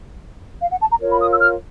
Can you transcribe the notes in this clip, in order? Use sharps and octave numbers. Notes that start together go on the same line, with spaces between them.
F5
F#5
A5
A#5
F4 A#4 C#5
B5
D#6
E6
F6